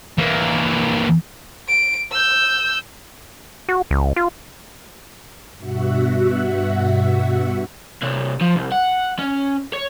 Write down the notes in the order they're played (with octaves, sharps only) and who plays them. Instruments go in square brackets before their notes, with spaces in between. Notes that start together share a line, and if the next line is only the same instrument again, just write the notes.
[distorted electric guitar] E3 A#3
[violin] D7
E6 G6
[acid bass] F#4
C#2
F4
[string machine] G2 B2 F#4 E5 F#5
[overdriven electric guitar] C3 D4
F3
C2
F#5
C#4
C#5